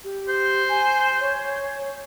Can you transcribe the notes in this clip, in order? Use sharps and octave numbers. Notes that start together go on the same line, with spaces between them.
G4
C5
G#5
C#5